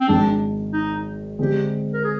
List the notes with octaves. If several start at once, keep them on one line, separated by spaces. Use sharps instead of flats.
C4
G#1 G#2 D#3 G#3 D4
D#4
D3 G#3 C4 G4
A#4
G#4